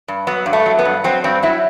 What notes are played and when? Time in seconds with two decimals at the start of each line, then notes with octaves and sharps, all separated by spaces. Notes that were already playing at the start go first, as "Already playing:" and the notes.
0.08 G2
0.27 F#3 B3
0.46 G2
0.53 A3
0.66 F#3
0.79 B3
0.85 G2
1.04 F#3 C4
1.24 G2 C4
1.43 F#3 E4